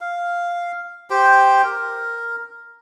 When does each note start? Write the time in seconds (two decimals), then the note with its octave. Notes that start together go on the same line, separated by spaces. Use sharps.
0.01 F5
1.10 G4 C5 G5
1.64 A#4